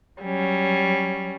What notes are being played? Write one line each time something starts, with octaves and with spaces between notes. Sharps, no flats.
F#3 G3 C#4